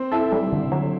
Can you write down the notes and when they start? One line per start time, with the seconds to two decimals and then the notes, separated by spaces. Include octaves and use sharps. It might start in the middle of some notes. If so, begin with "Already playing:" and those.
Already playing: C4 C5
0.12 E4 A4 E5
0.32 G3
0.53 D3
0.72 F#3